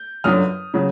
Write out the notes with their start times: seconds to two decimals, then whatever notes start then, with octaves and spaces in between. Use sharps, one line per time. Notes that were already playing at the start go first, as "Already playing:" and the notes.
Already playing: G6
0.24 G1 F#2 D3 F#3 D#6 F6
0.74 C#3 F#3